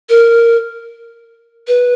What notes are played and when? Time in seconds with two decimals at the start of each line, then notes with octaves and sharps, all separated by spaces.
0.09 A#4
1.68 B4